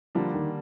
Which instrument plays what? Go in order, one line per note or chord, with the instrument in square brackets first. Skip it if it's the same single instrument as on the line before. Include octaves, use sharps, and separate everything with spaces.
[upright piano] D3 G3 A#3 D4 [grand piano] F3
[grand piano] D#3